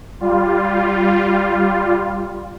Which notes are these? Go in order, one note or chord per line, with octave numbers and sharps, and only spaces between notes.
G3 F4